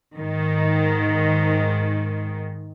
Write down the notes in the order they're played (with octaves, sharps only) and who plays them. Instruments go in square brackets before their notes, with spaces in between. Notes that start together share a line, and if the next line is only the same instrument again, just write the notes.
[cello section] G#2 D#3